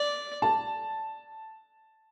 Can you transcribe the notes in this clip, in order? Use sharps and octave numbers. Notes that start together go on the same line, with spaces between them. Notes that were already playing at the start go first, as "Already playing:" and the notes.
Already playing: D5
A5